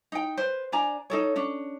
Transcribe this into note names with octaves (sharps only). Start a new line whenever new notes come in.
D#4 G5
B4 C5
D4 D5 G#5 A#5
D#4 A4 C#5
C#4 D4